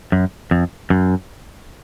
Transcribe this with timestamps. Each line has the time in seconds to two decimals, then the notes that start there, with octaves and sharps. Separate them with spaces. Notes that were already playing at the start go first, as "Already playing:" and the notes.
0.12 F#2
0.51 F2
0.90 F#2